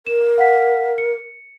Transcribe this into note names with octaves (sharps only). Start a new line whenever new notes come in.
A#4 E7
F5 F#5 B6
C#7